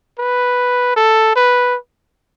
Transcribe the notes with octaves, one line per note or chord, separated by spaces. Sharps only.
B4
A4
B4